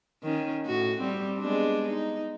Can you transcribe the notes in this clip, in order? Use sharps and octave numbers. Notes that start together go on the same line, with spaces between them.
D#3 C#4
A2 F#4
G3 C4
G#3 B3 D4
D#4